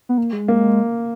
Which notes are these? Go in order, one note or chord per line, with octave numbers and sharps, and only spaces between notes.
B3
A#3
G#3
A#3